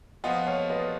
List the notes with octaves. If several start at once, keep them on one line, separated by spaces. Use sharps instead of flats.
F3 B3 F4 D#5 F#5
C#5 F5
B4 D#5